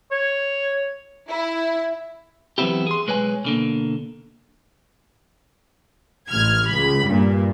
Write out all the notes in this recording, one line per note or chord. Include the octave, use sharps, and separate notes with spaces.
C#5
E4
E3 F#3 B3 C4 E4 G4
G#4 C6
B1 G#3 B4 C#5 G#5
B2 D3 A#3
A1 F6 G#6
C#2 B5
G2 A#2